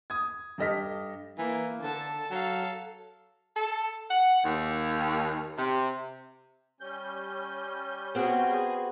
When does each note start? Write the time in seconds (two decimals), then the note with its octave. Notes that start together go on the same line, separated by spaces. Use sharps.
0.10 D#6 G#6
0.58 G2 G4 A4 D#5 F6 B6
1.38 E3 A#3
1.82 D3 A4 A5
2.31 F#3 A4 F5
3.56 A4
4.10 F#5
4.44 D#2
5.57 C3
6.81 G3 C#4 G6
8.15 B3 C4 F#4 G#4